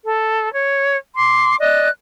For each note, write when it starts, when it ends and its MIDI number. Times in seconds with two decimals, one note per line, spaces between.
0.04 0.51 69
0.54 0.96 73
1.15 1.56 84
1.15 1.56 86
1.59 1.88 74
1.59 1.88 75
1.59 1.88 90